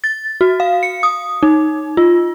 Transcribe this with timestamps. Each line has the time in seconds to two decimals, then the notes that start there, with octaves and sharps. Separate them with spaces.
0.04 A6
0.41 F#4
0.60 F5
0.83 C#7
1.03 D#6
1.43 D#4
1.97 F4